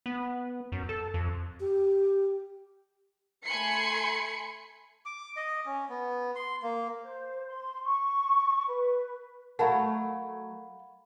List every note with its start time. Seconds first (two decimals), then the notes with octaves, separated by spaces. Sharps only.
0.06 B3
0.72 F#2
0.89 A4
1.14 F2
1.60 G4
3.45 A3 G#5 B5 C6 C7 C#7
5.05 D6
5.36 D#5
5.66 C#4
5.89 B3
6.35 C6
6.63 A#3
7.02 C5
7.48 C6
7.84 C#6
8.67 B4
9.59 F#3 A3 A#4 F5 F#5 A5 B5